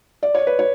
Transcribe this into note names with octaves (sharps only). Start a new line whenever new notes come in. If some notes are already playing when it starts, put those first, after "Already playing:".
D5
C#5
B4
C#5